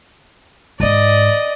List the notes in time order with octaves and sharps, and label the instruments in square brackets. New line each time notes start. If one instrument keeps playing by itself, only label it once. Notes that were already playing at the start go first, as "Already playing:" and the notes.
[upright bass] G#2 D#3 [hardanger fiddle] D5 D#5